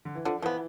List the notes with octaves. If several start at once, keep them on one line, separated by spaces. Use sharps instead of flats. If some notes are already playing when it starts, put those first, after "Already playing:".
D3
E3
D3 F3
E3 F3 B3